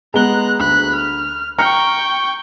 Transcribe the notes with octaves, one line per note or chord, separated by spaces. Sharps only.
G#3 B3 A#5 F#6 G7
D2 B5 F#6
F6
G5 A#5 C#6 F6 C#7